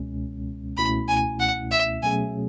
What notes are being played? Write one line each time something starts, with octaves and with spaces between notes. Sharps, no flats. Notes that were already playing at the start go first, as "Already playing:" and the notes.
Already playing: C#2 B2 G#3 C#4
C#2 B2 A3 C#4 E4 B5
G#5
F#5
E5
B2 F#3 A3 C#4 G#4 G#5